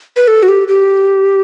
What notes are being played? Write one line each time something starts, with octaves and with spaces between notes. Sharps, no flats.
B4
A4
F#4
G4
G4